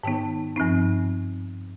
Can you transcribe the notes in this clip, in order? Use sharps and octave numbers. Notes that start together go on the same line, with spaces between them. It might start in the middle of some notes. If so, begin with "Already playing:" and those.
G#2 D#3 B3 D#4 G5
G2 F3 C4 D#4